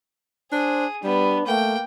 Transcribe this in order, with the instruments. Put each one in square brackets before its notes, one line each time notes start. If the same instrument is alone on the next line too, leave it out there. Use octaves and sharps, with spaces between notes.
[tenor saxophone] D4 [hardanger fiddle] G#4 [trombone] C5
[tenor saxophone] G3 [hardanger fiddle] B3 [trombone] D4
[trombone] A3 [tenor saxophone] A#3 [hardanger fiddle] G5